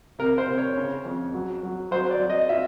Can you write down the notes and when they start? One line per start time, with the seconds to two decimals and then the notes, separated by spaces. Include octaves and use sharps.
0.19 C3 A#4
0.38 C5
0.48 C3
0.58 C#5
0.77 C#3
1.05 F2
1.33 F#3
1.63 F#3
1.91 F#3 C5
2.11 D5
2.20 F#3
2.30 D#5
2.49 F4 E5